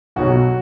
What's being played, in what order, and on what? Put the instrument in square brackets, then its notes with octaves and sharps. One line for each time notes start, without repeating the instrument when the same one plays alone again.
[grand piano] B1 B2 F#3 F#4